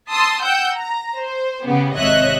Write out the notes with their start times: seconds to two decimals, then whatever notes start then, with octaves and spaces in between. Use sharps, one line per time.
0.11 A5 C6 D#6 E6
0.43 F#5 G5 E6 G6
0.75 A#5
1.17 C5
1.65 C#3 B3 G4
1.96 G#1 C3 C#5 D#5 E5 F#6